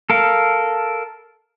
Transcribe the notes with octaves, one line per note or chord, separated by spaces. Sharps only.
A4 A#4 F5